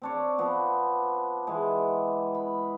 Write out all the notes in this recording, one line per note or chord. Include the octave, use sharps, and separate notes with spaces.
C4 D4 C#5
F3 B3 C4
E3 G#3
B5